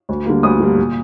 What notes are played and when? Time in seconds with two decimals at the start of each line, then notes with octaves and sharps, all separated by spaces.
0.09 D2
0.26 D3 G3 A#3
0.43 D2 D#6
0.60 D3 G3 A#3
0.78 A#2